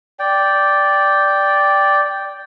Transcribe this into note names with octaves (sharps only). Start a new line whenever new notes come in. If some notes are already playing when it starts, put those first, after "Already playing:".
D5 G5